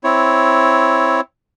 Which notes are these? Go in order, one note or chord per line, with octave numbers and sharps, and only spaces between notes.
C4 E4 C#5